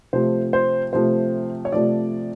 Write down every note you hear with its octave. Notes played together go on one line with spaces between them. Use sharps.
C3 F3 A3 C5
C5
C3 F3 A3 C5
C#5
C3 F3 A3 D5